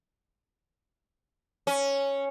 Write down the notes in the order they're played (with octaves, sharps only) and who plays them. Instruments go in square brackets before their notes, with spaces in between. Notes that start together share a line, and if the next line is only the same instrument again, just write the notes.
[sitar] C#4